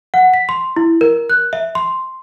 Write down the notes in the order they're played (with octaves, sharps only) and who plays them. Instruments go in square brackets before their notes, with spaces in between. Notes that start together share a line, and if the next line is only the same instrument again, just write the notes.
[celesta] F#5
B6
C6
E4
A#4
F#6
E5
C6